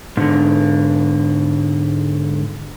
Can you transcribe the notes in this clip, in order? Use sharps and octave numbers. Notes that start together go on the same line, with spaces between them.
G#2 D3